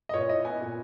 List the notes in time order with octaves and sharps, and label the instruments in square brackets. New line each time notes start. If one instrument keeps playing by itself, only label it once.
[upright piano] D#5
A#2 C#5
E4 D#5
B3 G#5
A#2